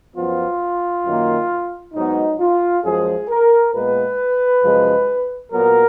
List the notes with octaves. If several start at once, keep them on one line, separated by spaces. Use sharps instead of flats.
F#2 F3 B3 F4
F#2 D#3 A#3
G#2 F#3 B3 D#4
F4
F#2 F3 G#3 G#4
A#4
A#2 G#3 B3 B4
F#2 C#3 F3 G#3
A#2 F#3 B3 A#4